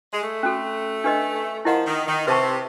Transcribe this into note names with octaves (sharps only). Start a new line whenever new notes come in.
G#3
A3
C#4 F#4 A4
D4 G4 B4 D#5
F3 E4 G4 A#4 D#5 F#5
D#3
D#3
C3 B4 E5 A5 C#6